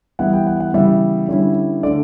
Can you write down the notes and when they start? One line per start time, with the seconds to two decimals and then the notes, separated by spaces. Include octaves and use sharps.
0.19 E3 G3 B3 E4 F#5
0.33 G5
0.47 F#5
0.60 F#5
0.74 C#3 E3 G3 B3 E5
1.28 D3 G3 C#4 E4
1.83 D3 A3 D4 D5